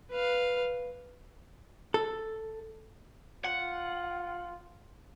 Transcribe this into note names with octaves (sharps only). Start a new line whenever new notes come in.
B4 F5
A4
F4 F#5